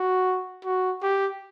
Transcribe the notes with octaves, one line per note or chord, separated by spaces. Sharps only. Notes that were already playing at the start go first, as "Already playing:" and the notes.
Already playing: F#4
F#4
G4